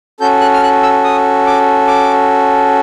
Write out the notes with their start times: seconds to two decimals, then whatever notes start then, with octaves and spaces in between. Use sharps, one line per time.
0.20 C#4 F#4 A4 G6
0.41 F#6
0.54 F6
0.63 F#6
0.83 E6
1.04 D#6
1.47 D6
1.87 D6